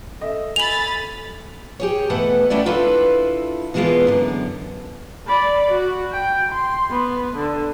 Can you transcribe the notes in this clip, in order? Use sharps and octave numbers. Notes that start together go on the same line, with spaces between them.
A4 D#5 E5
G#5 B5 A6 F7 F#7
G4 G#4 C#5
B2 E3 A3 A4 B4 F#5
D#3 A3 C#4 E4 D5
D4 E4 F4 A4 B4
B2 E3 G#3 A#3 B3 F4
F#2 D3
D5 B5
F#4
G5
C6
B3
D3